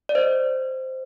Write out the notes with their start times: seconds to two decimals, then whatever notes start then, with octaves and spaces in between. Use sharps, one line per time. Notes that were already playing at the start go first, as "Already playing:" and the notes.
0.09 D5
0.15 C5 D#5